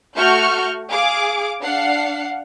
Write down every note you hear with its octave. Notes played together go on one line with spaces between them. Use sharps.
A3 F#4 C#6 F6 G6
G#4 F5 D6
D4 F5 F#5 C7